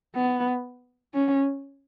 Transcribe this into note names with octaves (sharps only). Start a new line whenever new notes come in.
B3
C#4